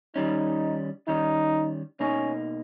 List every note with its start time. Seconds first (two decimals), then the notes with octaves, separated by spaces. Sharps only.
0.16 D#3 G3 C#4 D#4
1.08 D#3 G3 C#4 D#4
2.00 B2 A#3 C#4 D#4